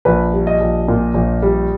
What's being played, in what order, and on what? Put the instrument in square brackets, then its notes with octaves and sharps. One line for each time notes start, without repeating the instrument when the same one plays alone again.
[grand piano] A#1 B4
G3
D#5
A#1
A#2
A#1
G3